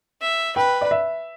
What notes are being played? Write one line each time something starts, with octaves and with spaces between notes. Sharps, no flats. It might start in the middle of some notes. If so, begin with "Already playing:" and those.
E5
B4 G5
D5
E5